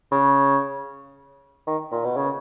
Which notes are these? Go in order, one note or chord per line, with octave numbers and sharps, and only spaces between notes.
C#3
D#3
A#2
B2
C#3